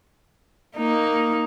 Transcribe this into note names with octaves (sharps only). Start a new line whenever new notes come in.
A#3 D#4